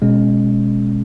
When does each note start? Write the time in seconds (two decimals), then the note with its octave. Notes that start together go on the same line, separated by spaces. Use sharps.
0.02 B2 G#3 C#4